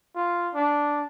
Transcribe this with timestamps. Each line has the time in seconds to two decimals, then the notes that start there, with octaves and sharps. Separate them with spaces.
0.15 F4
0.54 D4